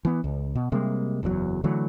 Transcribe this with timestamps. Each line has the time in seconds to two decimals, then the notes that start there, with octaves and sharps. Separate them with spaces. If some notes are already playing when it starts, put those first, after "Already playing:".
0.05 E3 B3
0.24 C#2
0.55 B2
0.72 C3 G3 G#3 A#3
1.23 F#1 E2 G2 F#3
1.64 D3 E3 F#3 A3